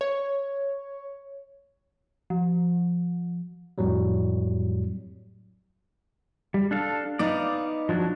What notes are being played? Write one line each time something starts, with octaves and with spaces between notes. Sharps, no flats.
C#5
F3
F2 A2 F#3 G3
G3
D4 A4 F5
B3 D#4 D5 F5
F3 F#3 D4